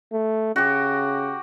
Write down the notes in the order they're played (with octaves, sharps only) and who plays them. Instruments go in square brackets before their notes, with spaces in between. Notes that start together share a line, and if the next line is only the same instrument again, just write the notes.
[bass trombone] A3
[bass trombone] C#3 [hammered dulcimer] F#4 G4